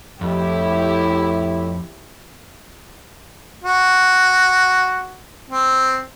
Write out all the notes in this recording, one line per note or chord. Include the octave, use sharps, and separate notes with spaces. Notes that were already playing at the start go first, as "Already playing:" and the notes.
F2 A2 E4 G4
F#4
C4